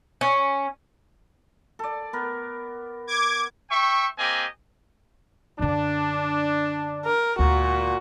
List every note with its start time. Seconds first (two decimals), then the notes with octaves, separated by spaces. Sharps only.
0.21 C#4
1.79 A4 D5
2.13 B3 A#4
3.07 D6 G#6
3.70 E5 G5 C#6
4.18 A#3 C4 G4 D#5 G#5
5.59 F#2 D3 D4
7.06 A#4
7.39 D2 A#2 G#3 F#4